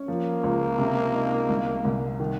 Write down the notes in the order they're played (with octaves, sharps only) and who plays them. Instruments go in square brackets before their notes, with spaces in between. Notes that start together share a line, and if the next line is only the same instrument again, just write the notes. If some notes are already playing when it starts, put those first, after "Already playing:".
Already playing: [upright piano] C#4
[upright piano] F3 [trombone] A#3
[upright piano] C#2
C3
D#4
C2
C2
D#3